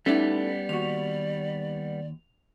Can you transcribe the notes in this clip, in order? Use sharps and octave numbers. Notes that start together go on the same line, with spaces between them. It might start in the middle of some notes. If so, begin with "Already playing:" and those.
G3 A3 B3 C#4 D#4 E4 D5
D#2 F#4 F7